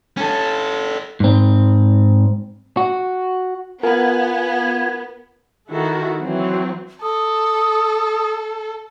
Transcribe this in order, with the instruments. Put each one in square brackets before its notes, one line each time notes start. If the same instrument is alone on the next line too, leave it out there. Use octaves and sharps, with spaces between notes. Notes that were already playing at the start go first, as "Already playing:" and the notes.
[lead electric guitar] C#4 A4
[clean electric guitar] G#2 C4
F#4
[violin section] B3 [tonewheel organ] F4 G#5 [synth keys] A#4
[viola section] D#3 E4 F#4 A4
E3 F#3 C4
[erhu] A4 [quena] D#6